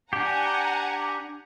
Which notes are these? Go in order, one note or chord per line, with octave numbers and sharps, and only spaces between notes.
D4 G4 F#5 G#5 A#5